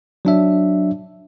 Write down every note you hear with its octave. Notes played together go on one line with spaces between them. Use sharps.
F#3 D4 E5